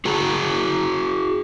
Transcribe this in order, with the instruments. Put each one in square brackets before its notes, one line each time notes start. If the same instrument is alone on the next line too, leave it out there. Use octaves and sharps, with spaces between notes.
[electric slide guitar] F#4 G#4 A#5